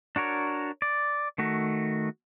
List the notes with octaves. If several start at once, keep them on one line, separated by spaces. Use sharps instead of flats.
D4 F#4 A#4 C#5
D5
D#3 A3 F#4